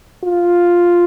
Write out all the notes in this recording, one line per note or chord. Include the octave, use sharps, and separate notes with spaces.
F4